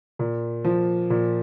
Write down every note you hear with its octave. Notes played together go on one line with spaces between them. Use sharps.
A#2
F3
A#2